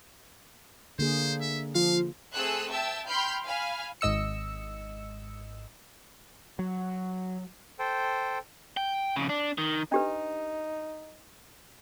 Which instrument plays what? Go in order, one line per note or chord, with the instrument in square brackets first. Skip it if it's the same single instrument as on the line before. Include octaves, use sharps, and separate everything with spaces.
[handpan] D3 A#3 G#4 [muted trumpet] C5
[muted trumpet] E5
[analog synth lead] F3 [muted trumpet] F5
[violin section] A3 C4 G#4 A4 E6 F#6
E5 G5 A5 E6
G5 B5 C6 F6 G6
F5 G#5 B5 F6
[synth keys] G#1 G#2 D#5 E6 C#7
[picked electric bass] F#3
[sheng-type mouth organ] A4 C5 G5
[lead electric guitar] G5
F2 C#3
D4
D#3
[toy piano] D4 G4 B4 [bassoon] D#4